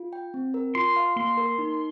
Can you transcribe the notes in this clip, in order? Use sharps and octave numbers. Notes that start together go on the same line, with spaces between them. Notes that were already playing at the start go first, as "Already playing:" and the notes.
Already playing: F4
G5
C4
A#4
F4 C6
F5
A#3 C6
A#4
D#4